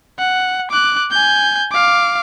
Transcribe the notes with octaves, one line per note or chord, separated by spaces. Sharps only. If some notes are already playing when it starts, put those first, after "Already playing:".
F#5
D6 F#6
G#5 G6
F5 D6